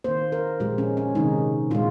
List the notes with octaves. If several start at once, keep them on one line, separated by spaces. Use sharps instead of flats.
D#3 A#3 C5
A#4
A#2 F3 G#3 G4
C#4
C#4
C3 D#3 G#3 D#4
A#2 G#3 F4